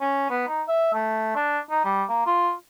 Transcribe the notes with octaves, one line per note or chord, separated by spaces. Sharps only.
C#4
B3
D#4
E5
A3
D4
D#4
G3
A#3
F4